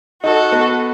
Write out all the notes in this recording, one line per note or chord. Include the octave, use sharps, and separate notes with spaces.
D#4 F#4 A4
B3